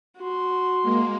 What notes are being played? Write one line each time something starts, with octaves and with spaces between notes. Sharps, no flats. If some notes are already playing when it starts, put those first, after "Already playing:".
F#4 C6
G#3 A#3